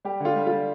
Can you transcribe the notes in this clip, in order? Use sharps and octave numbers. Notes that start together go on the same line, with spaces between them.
G3 G4
D3 F4
G3
F4
G3